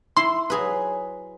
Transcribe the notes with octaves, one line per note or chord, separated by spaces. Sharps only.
E4 C6
F#3 G#4 B4